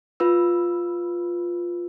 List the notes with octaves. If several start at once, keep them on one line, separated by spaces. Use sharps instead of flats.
F4 B4 E6